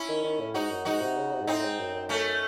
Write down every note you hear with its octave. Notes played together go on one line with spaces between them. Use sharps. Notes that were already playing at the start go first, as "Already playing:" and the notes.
Already playing: C#4 E4
D#3
D#3
A2
G#2 D#4 F#4
F#2
G#2 D#4 F#4
C3
C#3
C3
G#2
A2 C4 D#4
A2
G#2
F#2
F#2
A3 C#4